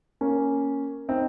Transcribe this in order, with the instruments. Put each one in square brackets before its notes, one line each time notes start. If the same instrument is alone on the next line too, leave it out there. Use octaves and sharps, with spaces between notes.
[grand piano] A#3 C#4
C4 D#4